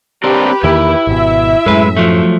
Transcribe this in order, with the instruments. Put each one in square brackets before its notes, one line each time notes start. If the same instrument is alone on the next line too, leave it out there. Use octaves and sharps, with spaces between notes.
[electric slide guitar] C4 D4 A#4 [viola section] G4 B4
[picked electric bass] E2 D#3 A#3 [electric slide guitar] E4
[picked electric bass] G#1 B2 [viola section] E5
[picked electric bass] F#2 A2 [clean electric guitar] G#3 B4
[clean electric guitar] F3 F#3 A3